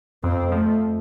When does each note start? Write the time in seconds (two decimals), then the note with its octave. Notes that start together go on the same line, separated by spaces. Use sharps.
0.24 F2 C4
0.52 F3 A3